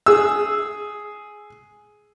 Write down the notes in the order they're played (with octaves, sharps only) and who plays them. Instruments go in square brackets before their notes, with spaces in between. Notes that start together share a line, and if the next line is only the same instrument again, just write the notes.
[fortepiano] G#4 E6